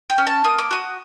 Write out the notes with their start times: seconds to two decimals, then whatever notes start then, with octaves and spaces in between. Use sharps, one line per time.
0.10 G5
0.18 C#4
0.27 A5
0.44 A#3 D#6
0.58 D6
0.71 F#4 D#6